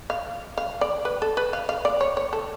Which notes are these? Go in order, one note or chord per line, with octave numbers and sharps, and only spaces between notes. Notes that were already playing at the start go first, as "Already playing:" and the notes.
F5
F5
D5
B4
A4
B4
F5
F5
D5
C#5
C#5
A4